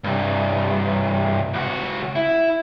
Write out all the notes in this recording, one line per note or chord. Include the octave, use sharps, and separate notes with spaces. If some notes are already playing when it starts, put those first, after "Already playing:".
C2 G2
C#2 F#4
E4